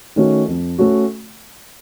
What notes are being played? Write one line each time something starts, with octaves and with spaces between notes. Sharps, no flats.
D#3 A3 C#4 F#4
F2
A3 C#4 F#4